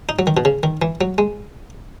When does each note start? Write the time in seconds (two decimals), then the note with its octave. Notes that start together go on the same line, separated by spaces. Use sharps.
0.09 D#4
0.19 F#3
0.27 D#3
0.37 B2
0.45 C#3
0.63 D#3
0.82 E3
1.01 F#3
1.18 G#3